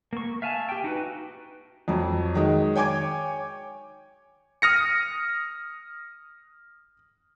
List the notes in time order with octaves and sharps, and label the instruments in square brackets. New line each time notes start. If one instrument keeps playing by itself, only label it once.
[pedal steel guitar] A#3 C#6
E5 F5 G#5 A5
G4 G5
D#4 F#4 B4
[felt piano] F2 F#3
D#3 F#3 G#3
C#5 G5 G#5 D6 G#6
[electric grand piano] D#6 F6 A#6 C#7